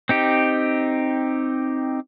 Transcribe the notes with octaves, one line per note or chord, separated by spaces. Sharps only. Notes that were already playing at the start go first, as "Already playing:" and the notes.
C4 D#4 G4